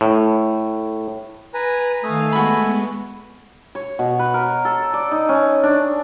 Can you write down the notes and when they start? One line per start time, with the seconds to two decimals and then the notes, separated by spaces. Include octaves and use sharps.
0.01 A2
1.54 B4 G#5 A#5
2.04 D#3 A3 F5 G#5 D#6
2.33 G#3 B3 F#4 B5
3.75 C#5
3.99 B2
4.19 B4
4.34 A#4
4.65 A4
4.94 D5
5.12 D#4
5.29 C#4
5.63 D4